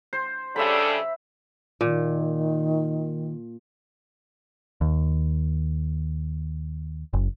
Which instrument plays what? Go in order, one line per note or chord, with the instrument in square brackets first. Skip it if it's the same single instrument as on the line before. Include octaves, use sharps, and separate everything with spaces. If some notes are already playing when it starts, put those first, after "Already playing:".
[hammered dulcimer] C5
[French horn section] C#3 G3 D4 [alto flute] A4 [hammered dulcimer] E5 B5
[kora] A#2 [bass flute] D#3
[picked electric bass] D#2
F#1